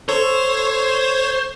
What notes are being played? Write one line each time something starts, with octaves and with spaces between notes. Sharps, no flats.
A4 C5 C#5